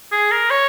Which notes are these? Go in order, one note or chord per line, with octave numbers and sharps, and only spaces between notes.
G#4
A#4
C#5